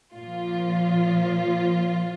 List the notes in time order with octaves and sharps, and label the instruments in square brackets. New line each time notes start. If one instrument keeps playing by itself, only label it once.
[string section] A#2 F3 F4